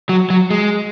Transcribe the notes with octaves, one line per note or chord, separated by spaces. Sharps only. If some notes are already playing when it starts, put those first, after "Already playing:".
F#3
F#3
G#3